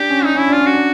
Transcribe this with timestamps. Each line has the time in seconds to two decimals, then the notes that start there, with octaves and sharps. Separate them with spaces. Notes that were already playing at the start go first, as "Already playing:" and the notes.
Already playing: D4 G4
0.10 C#4
0.22 D4 D#4
0.35 C#4 E4
0.48 D4 F4
0.61 C#4
0.66 F#4
0.73 D4